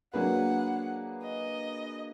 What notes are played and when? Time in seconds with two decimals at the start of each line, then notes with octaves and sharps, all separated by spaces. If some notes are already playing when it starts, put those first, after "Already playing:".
0.13 F#3 A#3 D4 G#4 B4 F#5
1.23 D#5